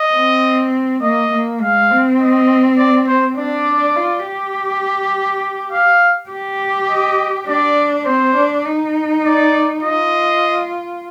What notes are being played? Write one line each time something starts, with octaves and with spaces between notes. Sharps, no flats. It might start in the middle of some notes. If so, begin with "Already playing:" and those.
Already playing: D#5
C4
A#3 D#5
A#3
G#3 F5
C4
D#5
D5
C5
D4 D5
F4
G4
F5
G4
D#5
D4 D5
C4 C5
D4
D#4
D5
F4 D#5